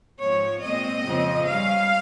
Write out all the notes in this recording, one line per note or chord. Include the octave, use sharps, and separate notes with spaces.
G#2 F3 C4 C#5
A#2 G#3 C4 D#5
F2 C#3 F3 C4
G2 G3 C#4 F5